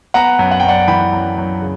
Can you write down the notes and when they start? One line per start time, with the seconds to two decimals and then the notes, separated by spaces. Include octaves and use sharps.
0.14 B3 F#5 A#5
0.39 F#2
0.51 F#5
0.60 F#2 G5
0.68 D5 F#5
0.88 E3 G5 B5
1.13 F#2
1.38 F#2
1.61 C#3